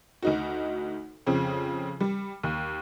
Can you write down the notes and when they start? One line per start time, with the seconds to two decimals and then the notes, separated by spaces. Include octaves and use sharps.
0.23 D2 D#4 F#4
1.26 F2 C#3 C4
2.00 G3
2.43 D#2